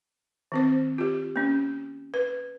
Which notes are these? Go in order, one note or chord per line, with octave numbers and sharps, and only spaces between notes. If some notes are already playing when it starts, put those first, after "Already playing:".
D#3 C4 C5
F4 G4
A#3 C#4
B4